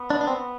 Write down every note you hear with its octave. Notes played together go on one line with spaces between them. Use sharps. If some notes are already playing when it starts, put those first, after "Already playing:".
Already playing: B3
D4
D4
C4